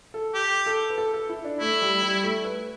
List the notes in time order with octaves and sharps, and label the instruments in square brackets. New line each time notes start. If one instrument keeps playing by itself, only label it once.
[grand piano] A4
[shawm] G4
[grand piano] A4
B4
A4
A4
E4
D4
[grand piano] A3 [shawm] E4
[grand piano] G3
G3
A3
B4